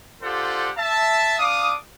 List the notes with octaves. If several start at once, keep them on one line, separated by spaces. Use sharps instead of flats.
D4 F4 G4 A4 C5 F#5
E5 A5
D4 F5 D6 D#6